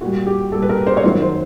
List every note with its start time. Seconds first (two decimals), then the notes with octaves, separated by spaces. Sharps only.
0.01 A#2 F#4
0.05 G3
0.27 G4
0.52 A#2 G3 A4
0.62 B4
0.69 A#4
0.87 C5
0.97 C#5
1.03 F#2 D#3 F#3 C5
1.21 C5